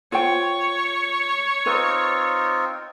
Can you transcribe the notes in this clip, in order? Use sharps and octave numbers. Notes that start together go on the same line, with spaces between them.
F4 C5 C#5 G5
C4 D#4 F4 B4